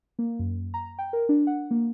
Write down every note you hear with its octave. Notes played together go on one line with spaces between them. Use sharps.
A#3
F#2
A#5
G5
A#4
D4
F#5
A#3